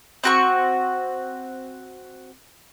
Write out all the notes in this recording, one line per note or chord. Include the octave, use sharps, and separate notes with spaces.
C4 F#4 C#6